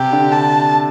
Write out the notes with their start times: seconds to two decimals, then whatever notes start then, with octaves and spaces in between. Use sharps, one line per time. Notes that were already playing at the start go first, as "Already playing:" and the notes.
Already playing: C3 G4
0.12 D3
0.32 A5